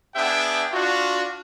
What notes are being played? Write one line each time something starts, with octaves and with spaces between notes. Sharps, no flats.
B3 D4 G#4 E5 G5
D4 F4 F#4